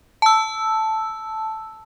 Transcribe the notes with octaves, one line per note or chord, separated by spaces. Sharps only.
A5 E6